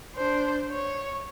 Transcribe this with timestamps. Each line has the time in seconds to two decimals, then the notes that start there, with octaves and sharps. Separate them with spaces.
0.16 D4 C5
0.72 C#5